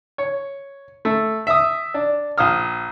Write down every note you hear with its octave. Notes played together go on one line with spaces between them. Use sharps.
C#5
A3
E5 D#6
D4
A#1 F5 D#6 F6